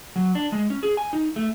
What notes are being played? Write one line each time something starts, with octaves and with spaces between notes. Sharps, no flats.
F#3
D4
G#3
C#4
G#4
G#5
D#4
A3